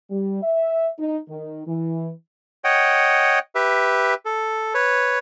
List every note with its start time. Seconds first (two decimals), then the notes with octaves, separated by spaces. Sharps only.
0.11 G3
0.42 E5
0.99 D#4
1.28 D#3
1.67 E3
2.64 C#5 D#5 F#5 G5
3.55 G4 B4 E5
4.25 A4
4.74 B4 C#5